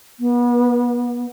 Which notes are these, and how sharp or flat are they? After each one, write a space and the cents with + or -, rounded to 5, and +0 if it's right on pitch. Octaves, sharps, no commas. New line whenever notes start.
B3 -35